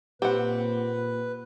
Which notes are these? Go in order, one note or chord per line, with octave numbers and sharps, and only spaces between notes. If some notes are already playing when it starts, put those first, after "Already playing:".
A#2 C4 G4 B4 F#5